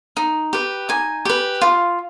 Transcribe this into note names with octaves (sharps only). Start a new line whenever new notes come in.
D#4
G4 B4
D#4 G#5
G4 B4
F4